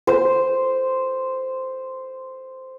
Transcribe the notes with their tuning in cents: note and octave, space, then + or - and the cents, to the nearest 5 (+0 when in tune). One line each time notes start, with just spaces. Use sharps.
C5 -5